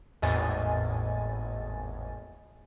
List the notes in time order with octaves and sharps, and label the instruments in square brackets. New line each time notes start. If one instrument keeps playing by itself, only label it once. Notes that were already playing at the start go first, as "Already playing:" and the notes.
[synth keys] G#1 E2 A2 D#5 G#5 A6